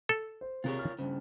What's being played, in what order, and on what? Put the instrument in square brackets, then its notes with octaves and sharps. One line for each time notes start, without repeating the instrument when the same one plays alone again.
[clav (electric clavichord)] A4
[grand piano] C5
[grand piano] C3 G#4 [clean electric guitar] F4 A#4 C#5
[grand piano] F6 A6
[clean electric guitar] G2 C#3 [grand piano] C5